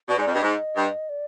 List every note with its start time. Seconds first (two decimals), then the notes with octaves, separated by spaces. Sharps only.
0.09 B2 D5
0.17 G#2
0.20 D5
0.26 F2
0.31 G2 D#5
0.42 G#2
0.76 G2
1.09 D5